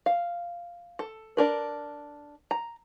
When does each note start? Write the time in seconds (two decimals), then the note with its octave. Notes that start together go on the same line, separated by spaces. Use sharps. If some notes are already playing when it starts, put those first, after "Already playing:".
0.06 F5
0.99 A4
1.37 D4 A#4 B4
2.51 A#5